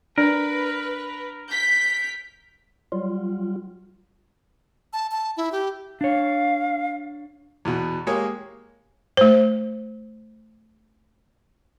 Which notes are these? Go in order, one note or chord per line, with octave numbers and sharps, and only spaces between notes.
D4 A#4 B4 D5
G6 B6
F#3 G3 F4
A5
A5
E4
G4
D4 C#5 F5
E2 B2
G#3 A#3 G4 C#5 D#6
A3 C5